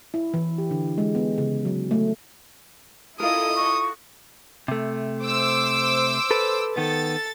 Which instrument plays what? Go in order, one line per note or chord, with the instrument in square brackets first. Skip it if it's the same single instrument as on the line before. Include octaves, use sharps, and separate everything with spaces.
[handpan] E4
E3
G4
D3
G#3
B3
C#3
F#3
A3
[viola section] E4 A4 D#5 [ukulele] F4 A#4 [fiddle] D#6
[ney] C#6
[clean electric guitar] C3 A3
[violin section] C5 D6 E6
[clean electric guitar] A4 B4
[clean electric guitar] D#3 B3 [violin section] A4 A6